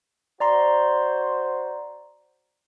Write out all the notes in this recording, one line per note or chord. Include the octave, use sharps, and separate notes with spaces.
F#4 C5 D5 A#5 C6